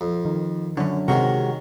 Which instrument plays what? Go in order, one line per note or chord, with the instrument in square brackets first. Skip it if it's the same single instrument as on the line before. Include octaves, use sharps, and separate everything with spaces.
[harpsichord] F2
[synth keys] D#3
[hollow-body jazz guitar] F#2 D3 [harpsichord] C#4
[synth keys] C3 [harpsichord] D#3 C#4 A#4 [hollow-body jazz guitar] G#3 F#4